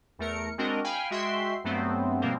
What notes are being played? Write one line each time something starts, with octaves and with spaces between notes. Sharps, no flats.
E2 A3 A#4 C#7
G#3 C4 D4 F#4 A#4 D#5
F5 G5 G#5 B5 F6
G#3 F#4 E5 G5 C6 C7
G2 F#3 A3 B3 C4
B2 F3 G3 A#3 C4